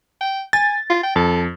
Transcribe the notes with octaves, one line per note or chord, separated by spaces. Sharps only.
G5
G#5 A6
F4
G5
F2 A4